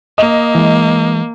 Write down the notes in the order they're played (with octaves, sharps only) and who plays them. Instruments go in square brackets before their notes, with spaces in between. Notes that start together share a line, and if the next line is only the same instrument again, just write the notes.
[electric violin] A#3 [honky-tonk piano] D#5
[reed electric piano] E3 G#3